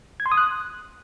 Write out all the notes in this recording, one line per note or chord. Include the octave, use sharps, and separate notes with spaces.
G#6
C6
D#6
F#6